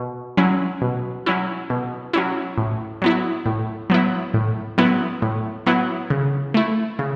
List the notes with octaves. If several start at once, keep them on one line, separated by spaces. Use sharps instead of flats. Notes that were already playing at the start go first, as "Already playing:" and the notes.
Already playing: B2
F#3 C#4 E4
B2
F#3 C#4 E4
B2
F#3 C#4 E4
A2
F#3 B3 E4
A2
F#3 B3 E4
A2
F#3 B3 E4
A2
F#3 B3 E4
C#3
A3 E4
C#3